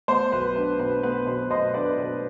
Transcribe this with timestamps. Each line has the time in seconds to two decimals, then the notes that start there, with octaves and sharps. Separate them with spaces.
0.08 B3 C5
0.32 B1 B4
0.55 D4 B4
0.79 B2 B4
1.03 B3 B4
1.27 B2 C5
1.51 B2 C5 D#5
1.74 D4 B4 D5
1.98 B2 B4